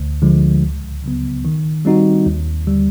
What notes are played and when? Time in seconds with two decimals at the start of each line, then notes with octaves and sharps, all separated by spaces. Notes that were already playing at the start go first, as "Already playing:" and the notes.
Already playing: D2
0.22 D3 F3 G#3
0.63 C#2
1.04 C#3 F#3 B3
1.45 D#3
1.85 G3 C4 D#4 F#4
2.26 D#2
2.67 D3 G3